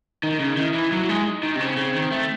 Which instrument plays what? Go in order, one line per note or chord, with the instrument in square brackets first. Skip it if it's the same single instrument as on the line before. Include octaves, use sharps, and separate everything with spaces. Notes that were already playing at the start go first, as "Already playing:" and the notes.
[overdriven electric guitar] D#3 [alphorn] D#4
[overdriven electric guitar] C#3
[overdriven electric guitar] D#3 [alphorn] E4
[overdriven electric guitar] E3
[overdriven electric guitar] F#3 [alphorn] E4
[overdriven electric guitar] F#3
G#3
[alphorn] D#4
[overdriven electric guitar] D#3
C3
[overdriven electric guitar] C#3 [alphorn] C4
[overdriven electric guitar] C#3
D#3
A3